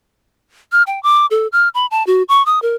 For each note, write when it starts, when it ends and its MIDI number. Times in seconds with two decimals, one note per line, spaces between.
0.72 0.83 89
0.87 1.01 79
1.03 1.26 86
1.31 1.47 69
1.52 1.69 89
1.74 1.86 83
1.91 2.05 81
2.07 2.23 66
2.29 2.45 85
2.46 2.61 87
2.62 2.76 70